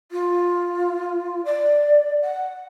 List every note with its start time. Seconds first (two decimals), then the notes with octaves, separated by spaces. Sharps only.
0.11 F4
1.45 D5
2.22 F#5